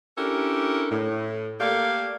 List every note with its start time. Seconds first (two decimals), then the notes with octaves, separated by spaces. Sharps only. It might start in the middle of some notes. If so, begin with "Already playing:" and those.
0.17 C#4 D4 E4 G4 A4 A#4
0.91 A2
1.60 A3 A#3 G4 A4 D5 F5